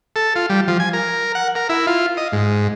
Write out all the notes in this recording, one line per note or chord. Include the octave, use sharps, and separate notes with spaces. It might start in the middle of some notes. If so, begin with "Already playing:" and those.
A4
F4
G3
F3
G#5
A#4
F#5
A#4
E4
F4
D#5
G#2